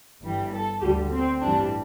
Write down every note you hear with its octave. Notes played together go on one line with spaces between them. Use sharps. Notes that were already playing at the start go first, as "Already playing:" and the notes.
G1 G2 E3 G3
A4
D2 D3 G3 G4
C4
A1 G2 E3 G3 D4